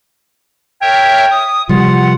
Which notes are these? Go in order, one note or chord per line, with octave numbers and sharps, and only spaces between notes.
A#4 C#5 E5 G5
D#6
C3 F3 G3 F4 F#5